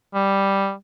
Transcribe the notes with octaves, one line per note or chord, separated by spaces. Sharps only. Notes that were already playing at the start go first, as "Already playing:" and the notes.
G3